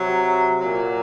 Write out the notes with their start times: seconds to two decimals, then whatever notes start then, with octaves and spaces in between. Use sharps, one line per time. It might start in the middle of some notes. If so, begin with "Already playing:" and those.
Already playing: C3 F#3
0.59 A#2 F#3